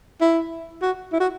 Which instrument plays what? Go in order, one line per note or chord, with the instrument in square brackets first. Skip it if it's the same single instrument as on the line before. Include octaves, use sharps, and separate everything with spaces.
[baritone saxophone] E4
F#4
E4
F#4